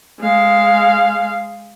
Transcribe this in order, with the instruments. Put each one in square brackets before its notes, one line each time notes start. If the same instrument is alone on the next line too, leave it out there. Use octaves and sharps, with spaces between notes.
[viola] G#3 F5